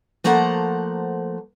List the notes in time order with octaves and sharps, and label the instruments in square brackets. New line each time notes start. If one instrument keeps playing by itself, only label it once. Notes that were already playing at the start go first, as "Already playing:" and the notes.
[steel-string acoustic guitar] F3 A3 A#3 C5 F#5 A#5